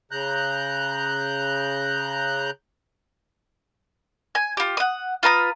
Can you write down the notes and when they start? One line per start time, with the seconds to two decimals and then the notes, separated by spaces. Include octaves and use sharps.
0.11 C#3 A#5 F#6 G6
4.35 G#5
4.57 F4 G4
4.77 F#5 D#6
5.23 F4 B4 A#5 D#6